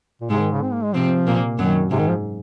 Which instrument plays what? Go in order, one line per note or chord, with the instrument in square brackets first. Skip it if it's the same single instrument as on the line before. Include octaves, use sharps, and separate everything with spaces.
[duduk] A#2
[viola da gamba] G#2 G#3 [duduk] C3
[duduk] D#3
C#3
C4
A#3
G#3
[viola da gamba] C3 C4 [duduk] F3
[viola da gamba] A#2 A#3
[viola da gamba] F#2 F#3 [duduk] D#3
[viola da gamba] G#2 [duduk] C3
[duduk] D#3
F3